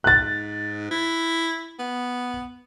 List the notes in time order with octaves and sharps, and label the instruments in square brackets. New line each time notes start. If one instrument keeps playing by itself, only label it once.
[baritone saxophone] G#2 [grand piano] F#6 A6
[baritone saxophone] E4
B3